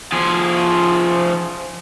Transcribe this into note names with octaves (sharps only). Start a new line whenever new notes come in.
F3 G#4